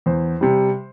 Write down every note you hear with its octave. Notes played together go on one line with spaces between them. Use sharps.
E2 C5
C3 G3